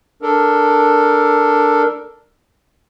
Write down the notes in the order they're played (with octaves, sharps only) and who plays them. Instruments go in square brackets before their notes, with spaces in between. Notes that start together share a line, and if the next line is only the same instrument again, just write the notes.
[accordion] D4 A4 A#4